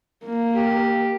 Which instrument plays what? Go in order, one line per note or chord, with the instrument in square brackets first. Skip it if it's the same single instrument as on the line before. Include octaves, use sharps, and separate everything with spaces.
[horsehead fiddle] A#3
[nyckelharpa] G4